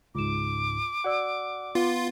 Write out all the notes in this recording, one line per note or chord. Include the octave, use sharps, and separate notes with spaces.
C#2 G#2 F4 D6 E7
F#4 D5 F#5 E6
B3 F4